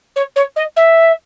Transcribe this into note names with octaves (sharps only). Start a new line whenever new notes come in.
C#5
C#5
D#5
E5